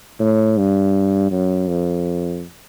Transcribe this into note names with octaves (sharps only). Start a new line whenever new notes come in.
A2
G2
F#2
F2